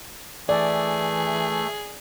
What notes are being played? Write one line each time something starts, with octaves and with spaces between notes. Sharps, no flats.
E3 A3 G#4 D5